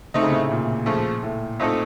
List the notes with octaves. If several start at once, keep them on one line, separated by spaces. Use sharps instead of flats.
C3 A3 C4 D#4
C#3
A2 C3
A#2
C#3 F3 A3
A2
A#2 A3 C4 D#4 A4